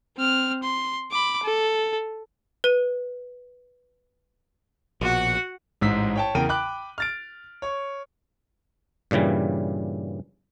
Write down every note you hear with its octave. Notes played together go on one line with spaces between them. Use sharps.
C4 F6
C6
B5 D6
A4
B4 D#7
A#1 B2 F#4 F#5
A1 G#2 G#3 E6 B6
C#5 G5 A5
E2 C#3 A#4 G5 D#7
G5 B5 D6 F#6
F6 A6 D7
C#5 C#6
G2 A#2 C#3 E3 G3